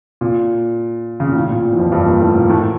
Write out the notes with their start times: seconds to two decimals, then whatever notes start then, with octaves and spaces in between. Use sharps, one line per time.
0.21 A#2
1.20 C#3
1.28 A#2
1.35 A2
1.50 A#2
1.64 A#2
1.73 E3
1.78 F2 F3
1.92 G2 G3
2.06 A#2 A#3
2.21 A2 A3
2.35 A#2 A#3
2.50 A2 A3